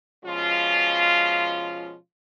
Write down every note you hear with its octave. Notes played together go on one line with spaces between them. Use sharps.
B2 F3 G#3 C#4 F4